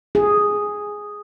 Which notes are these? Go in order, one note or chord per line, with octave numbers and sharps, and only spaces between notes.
G#4